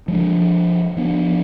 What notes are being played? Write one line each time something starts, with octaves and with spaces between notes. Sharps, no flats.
F3 G#3 D4
F3 B3 D4